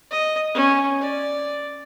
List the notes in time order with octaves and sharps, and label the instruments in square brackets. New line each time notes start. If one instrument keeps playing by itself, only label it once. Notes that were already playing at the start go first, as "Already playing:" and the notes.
[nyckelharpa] D#5
C#4
D5